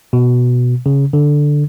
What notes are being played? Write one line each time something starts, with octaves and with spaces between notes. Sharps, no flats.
B2
C#3
D3